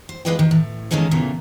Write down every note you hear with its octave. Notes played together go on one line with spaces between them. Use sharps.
C5
G#3 F4 B4 D5 D#5 G5
D#3
A2
D#3 G#3 A#3 C#4 D#4 A4
E2 A#2 C#3 E3 A3